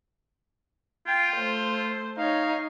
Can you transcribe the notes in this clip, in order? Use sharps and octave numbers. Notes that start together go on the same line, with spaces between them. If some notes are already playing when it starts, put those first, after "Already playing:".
F4 G5
A3 C5
D#4 C#5 F5